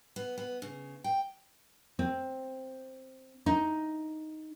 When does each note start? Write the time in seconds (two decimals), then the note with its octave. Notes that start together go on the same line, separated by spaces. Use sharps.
0.16 B3
0.38 B3
0.62 C#3
1.04 G5
1.99 C4
3.46 D#4